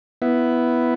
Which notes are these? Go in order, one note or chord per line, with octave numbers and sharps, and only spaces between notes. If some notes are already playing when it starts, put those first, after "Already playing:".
B3 E4